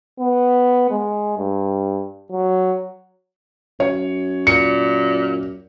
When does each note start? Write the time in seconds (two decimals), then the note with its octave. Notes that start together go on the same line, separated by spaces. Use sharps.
0.20 B3
0.91 G#3
1.38 G2
2.32 F#3
3.80 F#2 C#5
4.47 A#2 C#7